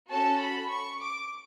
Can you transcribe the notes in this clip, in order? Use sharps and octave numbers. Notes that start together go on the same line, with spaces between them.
C#4 F#4 A4 A5
B5
C#6
D6